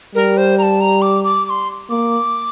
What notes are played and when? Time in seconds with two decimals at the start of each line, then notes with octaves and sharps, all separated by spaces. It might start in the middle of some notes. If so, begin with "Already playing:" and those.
0.15 G3 A#4
0.37 C5
0.58 A#5
0.63 A5
0.81 A#5
1.02 D6
1.24 D6
1.45 D6
1.50 C6
1.90 A#3 D6